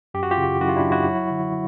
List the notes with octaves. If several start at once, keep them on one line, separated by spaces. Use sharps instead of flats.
F#2 G4
F#4
F4 G4
C#3
F#2 E4 F#4
F4
D4 E4
F#3
E4 F#4
F#3
D3